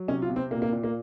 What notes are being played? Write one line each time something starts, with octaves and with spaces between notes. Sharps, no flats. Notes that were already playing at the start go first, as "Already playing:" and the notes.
Already playing: F#3
C3 C#4
F4
C3
C4
A#2 A#3
A#3
A#2
A#3